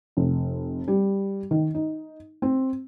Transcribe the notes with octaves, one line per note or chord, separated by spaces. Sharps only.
F1
G3
D#3
D#4
C4